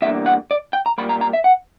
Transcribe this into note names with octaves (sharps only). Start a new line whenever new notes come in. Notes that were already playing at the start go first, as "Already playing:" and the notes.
E2 D3 G3 A#3 E5
F#5
D5
G5
A#5
A#2 G3 A#3 B5
A#5
A#5
E5
F#5